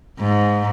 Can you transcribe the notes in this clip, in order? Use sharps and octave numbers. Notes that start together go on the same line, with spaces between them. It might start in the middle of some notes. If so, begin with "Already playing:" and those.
G#2